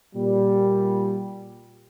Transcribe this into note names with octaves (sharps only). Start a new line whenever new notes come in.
A#2 G3